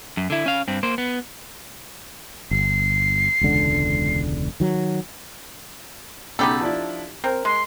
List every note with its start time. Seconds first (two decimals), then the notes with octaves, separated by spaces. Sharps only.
0.17 F#2
0.30 D3 E4
0.46 C#4 F5
0.68 G2 C4
0.83 A#3 C5
0.98 B3
2.51 G1 C7
3.41 E1 C#2 D3
4.60 D#3 F#3
6.39 B1 C#3 D#4 G4 A4 B5
6.61 F3 D4 E4
7.24 C4 A#4
7.45 G#3 C6